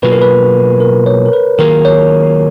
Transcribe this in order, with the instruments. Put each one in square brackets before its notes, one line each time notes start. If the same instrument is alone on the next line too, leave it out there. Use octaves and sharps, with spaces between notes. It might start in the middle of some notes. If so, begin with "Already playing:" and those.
[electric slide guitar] B2 F#3 A#3 F4 G#4 [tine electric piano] B4
[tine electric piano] A#4
B4
A#4
C#5
A#4
B4
[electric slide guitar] D#3 F#3 A#3 F4 G#4 [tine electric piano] A#4
[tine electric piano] C#5